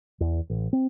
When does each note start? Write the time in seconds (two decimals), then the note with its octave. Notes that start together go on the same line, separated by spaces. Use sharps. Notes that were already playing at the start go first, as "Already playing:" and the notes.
0.21 E2
0.50 A1
0.73 C4